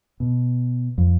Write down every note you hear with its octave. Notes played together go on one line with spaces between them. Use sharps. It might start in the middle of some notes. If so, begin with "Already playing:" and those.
B2
F2